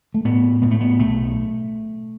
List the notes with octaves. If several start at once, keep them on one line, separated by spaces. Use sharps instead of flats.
A3
A2 B3
A2 B3
A3
B3
B1 A3